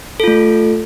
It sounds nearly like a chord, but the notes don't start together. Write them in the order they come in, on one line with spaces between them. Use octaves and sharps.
A4 F4 A3